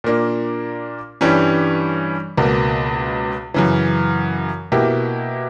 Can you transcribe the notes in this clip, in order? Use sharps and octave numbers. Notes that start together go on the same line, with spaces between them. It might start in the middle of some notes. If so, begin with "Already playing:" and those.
A#2 A#3 D4
G2 E3 G3 C#4
C#2 B2 A#3
F#2 C#3 E3
B2 A#3 E4 G4